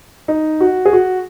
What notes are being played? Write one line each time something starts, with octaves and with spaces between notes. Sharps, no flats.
D#4
F#4
G#4
F#4